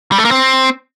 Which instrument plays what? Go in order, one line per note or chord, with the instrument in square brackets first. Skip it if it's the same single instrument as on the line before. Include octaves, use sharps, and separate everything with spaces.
[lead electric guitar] G3
A3
A#3
C4